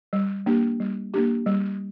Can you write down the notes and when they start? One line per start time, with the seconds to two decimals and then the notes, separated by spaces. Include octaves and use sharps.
0.13 G3
0.46 A#3 D4 G4
0.80 G3
1.14 A#3 D4 G4
1.46 G3